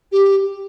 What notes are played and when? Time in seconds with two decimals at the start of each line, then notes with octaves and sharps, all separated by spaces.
0.12 G4